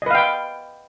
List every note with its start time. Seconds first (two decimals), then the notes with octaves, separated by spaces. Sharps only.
0.02 D#5
0.06 B4
0.11 F5
0.15 G5